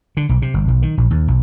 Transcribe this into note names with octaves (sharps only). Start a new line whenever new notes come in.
D3
B1
C3
G1
B1
D#3
A#1
D#2
B1